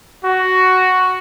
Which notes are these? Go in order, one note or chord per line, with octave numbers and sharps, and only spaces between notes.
F#4